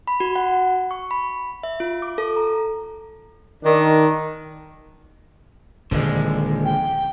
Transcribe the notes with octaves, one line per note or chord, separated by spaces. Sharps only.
B5
F#4
F#5
C#6
B5
E5
F4
D6
A4
A#5
D#3 D4
D#1 D3 F3 G#3
G5